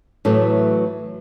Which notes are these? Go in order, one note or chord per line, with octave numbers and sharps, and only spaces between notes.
A2 E3 F#3 A3